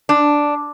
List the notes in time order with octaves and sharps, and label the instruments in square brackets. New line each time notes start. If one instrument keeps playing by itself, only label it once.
[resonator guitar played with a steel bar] D4